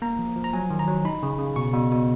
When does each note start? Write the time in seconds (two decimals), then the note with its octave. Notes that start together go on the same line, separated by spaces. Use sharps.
0.02 A#3 A#5
0.19 F3
0.36 F3
0.44 A#5
0.53 F#3 G#5
0.70 D#3
0.79 A#5
0.88 F#3
1.05 D#4 B5
1.23 C#3
1.39 C#3
1.56 B2 C#6
1.73 B2
1.92 B2